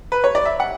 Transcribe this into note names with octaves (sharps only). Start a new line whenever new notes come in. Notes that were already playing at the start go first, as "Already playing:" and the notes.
B4
C#5
D5
E5
F#5